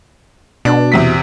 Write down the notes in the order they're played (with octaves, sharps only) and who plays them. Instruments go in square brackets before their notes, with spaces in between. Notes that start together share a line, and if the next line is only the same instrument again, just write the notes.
[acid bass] B2 [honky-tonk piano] D4
[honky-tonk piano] E2 C3 B6